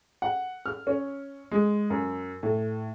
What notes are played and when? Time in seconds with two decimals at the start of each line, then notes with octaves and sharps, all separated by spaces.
0.22 F#5
0.66 F6
0.87 C#4
1.52 G#3
1.90 F#2
2.43 A2